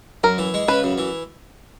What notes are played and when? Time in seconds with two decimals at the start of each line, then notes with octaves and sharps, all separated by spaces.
0.24 F#2 A#4
0.38 E3
0.54 G#3
0.68 C#3 B4
0.83 F#2
0.98 E3